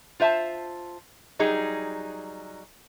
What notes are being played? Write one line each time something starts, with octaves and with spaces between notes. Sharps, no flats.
F4 C5 E5 A5
F#3 G3 D#4 G#4